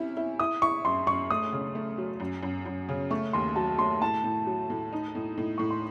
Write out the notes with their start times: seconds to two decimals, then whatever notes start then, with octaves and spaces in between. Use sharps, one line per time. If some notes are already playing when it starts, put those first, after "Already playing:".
Already playing: C3 C#4 E4
0.17 E4
0.39 E4 D#6
0.62 E4 C#6
0.85 F#2 C6
1.07 F#2 C#6
1.31 A3 D#6
1.53 C#3
1.75 A3
1.98 F#3
2.20 F#2
2.43 F#2
2.66 F#2
2.89 C#3
3.11 A3 C#6
3.33 D#2 C6
3.56 F#3 A5
3.78 A3 C6
4.01 A2 A5
4.24 A2
4.47 F#3
4.70 A2
4.93 D#4
5.15 A2
5.38 A2
5.58 A2 C#6
5.71 C6